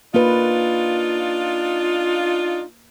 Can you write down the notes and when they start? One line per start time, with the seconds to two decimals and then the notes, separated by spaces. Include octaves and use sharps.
0.14 A#3 D4 D#4 F4 B4